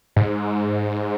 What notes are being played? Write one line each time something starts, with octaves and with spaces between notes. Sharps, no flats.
G#2